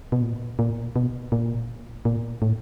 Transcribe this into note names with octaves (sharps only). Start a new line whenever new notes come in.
B2
A#2
A#2
B2
A#2
A#2
A2